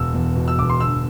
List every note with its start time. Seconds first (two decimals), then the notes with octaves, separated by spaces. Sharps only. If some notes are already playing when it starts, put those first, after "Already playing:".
Already playing: E1 E6
0.14 E2
0.36 B2
0.48 E6
0.58 E1 D6
0.70 C6
0.80 G1 E6